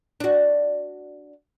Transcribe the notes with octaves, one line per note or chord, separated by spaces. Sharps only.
D4 F#4